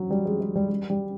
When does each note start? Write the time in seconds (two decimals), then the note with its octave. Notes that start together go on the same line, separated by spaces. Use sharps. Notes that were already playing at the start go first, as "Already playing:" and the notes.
Already playing: F#3
0.10 G3
0.25 G#3
0.40 G#3
0.55 G3
0.69 G3
0.90 G3